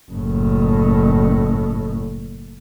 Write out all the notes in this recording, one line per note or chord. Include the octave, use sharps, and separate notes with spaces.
F#1 A2